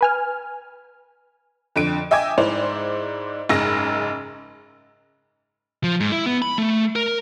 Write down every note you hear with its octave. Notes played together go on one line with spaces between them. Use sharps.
B4 G#5 F6
F2 D3 D7
D#5 E5 G5 G#5 D6 G#6
G#2 E4 C5 D5 F7
F#1 G#2 G#4 E6 A#6
F3
G#2
E4
B3
B5
A3
A#4